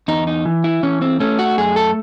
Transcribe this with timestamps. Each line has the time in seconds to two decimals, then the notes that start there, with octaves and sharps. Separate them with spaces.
0.08 E2 D#4
0.27 D#4
0.46 E3
0.64 E4
0.83 E3 C#4
1.02 C4
1.20 A3 C#4
1.39 F#4
1.58 F#2 G#4
1.76 A4